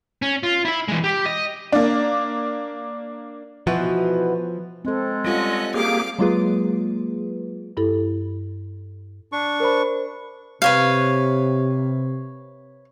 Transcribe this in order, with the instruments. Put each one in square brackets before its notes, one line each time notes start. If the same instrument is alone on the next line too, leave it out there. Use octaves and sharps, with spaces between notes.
[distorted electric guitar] C#4
F4
E4 E5
E3 G#3
G4
D#5
[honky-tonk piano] A#3 D4
[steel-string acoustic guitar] B2 E3 F#4 [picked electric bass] F3
[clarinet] G#3 [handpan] C4 A4
[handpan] G3 F4 A4 [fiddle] C#4 F#5 [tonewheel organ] D#5
[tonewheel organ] A#3 G4 G#4 [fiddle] F5 D6
[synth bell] F#3 G#3 A#3 F4 G#4 B4
[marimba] G2 E4 A4
[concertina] D4 C#6
[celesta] A#4 C5 B5
[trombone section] C3 [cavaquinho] B4 C#5 F5